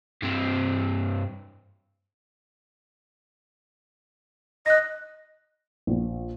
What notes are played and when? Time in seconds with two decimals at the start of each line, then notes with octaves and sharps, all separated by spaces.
0.23 G2 C4
4.66 D#5 F#6 A#6
5.87 A#1